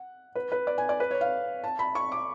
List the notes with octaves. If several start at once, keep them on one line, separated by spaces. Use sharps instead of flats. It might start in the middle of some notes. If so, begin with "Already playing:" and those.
Already playing: F#5
B4
B4
D5
G#5
D5
B4
C#5
F5
A5
B5
C#6
D6